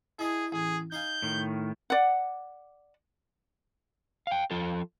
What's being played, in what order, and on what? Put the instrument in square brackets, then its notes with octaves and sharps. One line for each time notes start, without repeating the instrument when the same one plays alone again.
[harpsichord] E4 D#5 A5 [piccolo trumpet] G#4
[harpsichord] A1 [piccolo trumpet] G#4
[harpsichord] D#4 F5 G#5 [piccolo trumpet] G6
[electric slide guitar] A2 D#3
[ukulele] D5 F#5
[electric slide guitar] F5 G5
F3 F4 A4